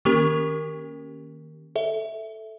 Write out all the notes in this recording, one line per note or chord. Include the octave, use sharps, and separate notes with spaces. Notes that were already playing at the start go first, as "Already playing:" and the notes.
D#3 A#3 C#4 G4 A#4
A4 E5